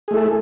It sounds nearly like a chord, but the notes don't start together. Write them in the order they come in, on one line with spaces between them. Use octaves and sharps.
G#4 A3 E4 A4